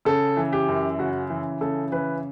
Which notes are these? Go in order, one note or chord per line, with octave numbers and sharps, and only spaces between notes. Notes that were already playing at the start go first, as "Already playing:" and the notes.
C#3 A4
E3
G4
F#2
C#3 F#4
E3
C#3 A4
E3 B4